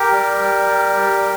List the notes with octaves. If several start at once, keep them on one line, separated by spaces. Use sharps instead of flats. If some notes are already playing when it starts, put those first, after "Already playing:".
Already playing: G4 A#4
G3
G3
G3
G3